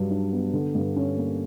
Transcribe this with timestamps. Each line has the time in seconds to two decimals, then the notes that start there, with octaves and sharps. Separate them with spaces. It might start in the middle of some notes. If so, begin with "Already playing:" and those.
Already playing: G2 F#3
0.10 D4
0.32 B3
0.53 D3
0.75 G2
0.96 C#4
1.17 A#3